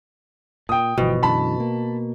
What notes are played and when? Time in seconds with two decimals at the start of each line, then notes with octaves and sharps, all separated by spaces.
0.69 A#2 G5 D#6
0.98 G1 B2 E3 F3
1.23 F#2 D3 E3 A5 B5
1.60 A#3